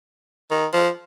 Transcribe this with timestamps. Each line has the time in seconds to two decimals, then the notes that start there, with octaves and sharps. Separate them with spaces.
0.51 D#3
0.73 F3